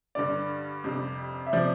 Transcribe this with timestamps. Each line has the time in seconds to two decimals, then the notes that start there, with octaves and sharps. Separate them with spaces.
0.15 G2 D3 G3 D5
0.84 F2 C3 G3
1.46 E5
1.53 C3 F3 D5